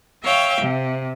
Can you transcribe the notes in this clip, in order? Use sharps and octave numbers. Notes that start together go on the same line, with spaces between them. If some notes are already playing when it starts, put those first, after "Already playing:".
C#5 E5 F5 G5
C3